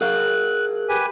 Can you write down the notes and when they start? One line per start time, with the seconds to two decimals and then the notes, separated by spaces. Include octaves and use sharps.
0.01 G#4 A#4 F5 F#6
0.89 G4 B4 G#5